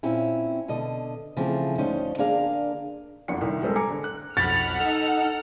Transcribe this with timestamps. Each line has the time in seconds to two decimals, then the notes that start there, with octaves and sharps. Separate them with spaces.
0.03 A#2 C4 C#4 E4
0.68 B2 D3 D#5
1.37 C#3 E3 F3 A3 C4
1.78 D2 F3 C#4 D#4 C5
2.18 D3 A#3 D4 G#4 A#4 F5
3.28 F#1 F2 D4 F#5 C#7
3.41 C2 D#3
3.62 G3 G#3 C4 A4 A#4
3.76 G#5 A#5 D6 C#7
3.90 D3
4.04 F#6
4.37 B1 F2 F#5 B5 F6 A6
4.80 D#4 A4